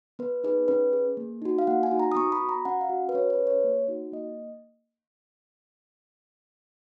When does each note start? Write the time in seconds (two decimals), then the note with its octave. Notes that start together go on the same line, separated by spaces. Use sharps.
0.19 B3 B4
0.44 D#4 G#4 B4
0.68 C#4 B4
0.93 G#4
1.17 A#3
1.42 D#4 F#4
1.59 F5
1.67 A#3 F#5
1.83 G#5
1.91 D#4 F#4
1.99 A#5
2.12 D#6
2.15 B3 C#6
2.32 B5
2.41 F#4
2.49 A#5
2.65 C#4 F#5
2.81 F5
2.89 F#4
3.09 B4
3.14 C#4 C#5
3.30 B4
3.39 G#4
3.47 C#5
3.64 A#3
3.88 D#4 F#4
4.12 A#3 D#5